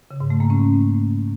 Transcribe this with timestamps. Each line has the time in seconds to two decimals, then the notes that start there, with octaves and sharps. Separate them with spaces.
0.11 C#3
0.20 G#2
0.30 A3
0.40 A#3
0.50 C#4